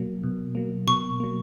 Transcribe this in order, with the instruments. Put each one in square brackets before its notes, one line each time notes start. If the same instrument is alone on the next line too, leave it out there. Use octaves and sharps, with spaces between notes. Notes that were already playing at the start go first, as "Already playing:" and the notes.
Already playing: [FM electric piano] B2 F#3 A#3
B2
F#3 A#3
[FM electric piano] B2 [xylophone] C#6
[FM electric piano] F#3 A#3